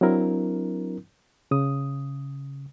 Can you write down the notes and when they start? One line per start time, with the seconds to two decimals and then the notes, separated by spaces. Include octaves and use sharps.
0.01 F#3 C4 D4 E4 A#4
1.51 C#3 D#6